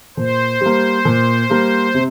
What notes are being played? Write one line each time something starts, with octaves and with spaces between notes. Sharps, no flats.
A#2 C5
G3 A#3
A#2
G3 A#3
C3